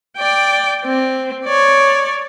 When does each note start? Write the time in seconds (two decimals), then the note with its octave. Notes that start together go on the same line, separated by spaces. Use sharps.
0.16 D5 G5
0.85 C4
1.44 C#5 D5